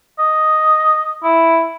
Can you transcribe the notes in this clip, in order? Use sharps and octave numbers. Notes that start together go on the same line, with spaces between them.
D#5
E4